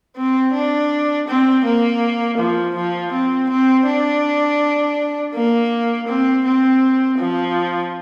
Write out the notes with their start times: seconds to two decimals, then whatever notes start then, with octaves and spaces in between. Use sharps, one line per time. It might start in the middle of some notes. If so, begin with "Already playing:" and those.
0.16 C4
0.53 D4
1.28 C4
1.64 A#3
2.38 F3
2.75 F3
3.12 C4
3.49 C4
3.86 D4
5.34 A#3
6.08 C4
6.45 C4
7.18 F3